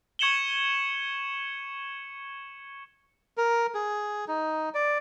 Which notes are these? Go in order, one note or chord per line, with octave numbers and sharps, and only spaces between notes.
C#6 G#6 C#7 E7 F#7 G7
A#4
G#4
D#4
D5